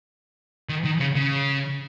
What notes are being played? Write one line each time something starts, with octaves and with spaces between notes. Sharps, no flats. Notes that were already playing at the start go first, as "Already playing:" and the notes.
D#3
D#3
C#3
C#3